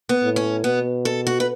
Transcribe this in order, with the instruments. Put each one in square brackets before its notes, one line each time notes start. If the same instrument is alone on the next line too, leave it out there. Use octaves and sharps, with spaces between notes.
[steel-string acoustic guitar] B3
[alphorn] A2
[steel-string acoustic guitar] C#4
[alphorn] B2 [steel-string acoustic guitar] B3
[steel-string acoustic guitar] A4
F#4
B4